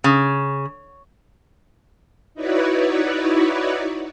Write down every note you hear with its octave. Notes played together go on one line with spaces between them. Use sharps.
C#3
D#4 E4 F#4 B4 C#5 D5